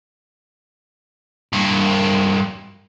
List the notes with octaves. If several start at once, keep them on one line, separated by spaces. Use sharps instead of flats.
G2 A#3